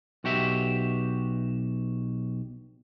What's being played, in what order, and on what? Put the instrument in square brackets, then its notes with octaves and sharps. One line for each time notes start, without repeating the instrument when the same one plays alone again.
[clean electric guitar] B1 F#4 G4 E5